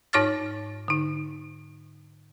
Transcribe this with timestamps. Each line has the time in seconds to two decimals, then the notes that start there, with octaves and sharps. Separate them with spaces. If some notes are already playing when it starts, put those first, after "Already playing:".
0.13 G#2 D#4 C#5 D6 F6 A6
0.88 D3 D#4